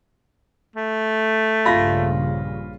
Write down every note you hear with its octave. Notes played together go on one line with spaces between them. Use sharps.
A3
A#1 G2 C#3 F4 B5 A#6